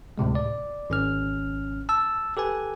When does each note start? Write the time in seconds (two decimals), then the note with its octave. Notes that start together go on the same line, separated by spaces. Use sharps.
0.18 D2 A2 C3 G#3
0.35 D5
0.90 G#1 C#4 F6
1.89 A5 E6
2.37 G4 A4 B4 G#5